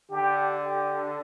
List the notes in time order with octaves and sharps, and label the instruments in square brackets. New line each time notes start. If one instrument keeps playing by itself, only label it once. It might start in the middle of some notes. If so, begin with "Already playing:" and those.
[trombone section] D3 [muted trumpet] G4
[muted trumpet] G4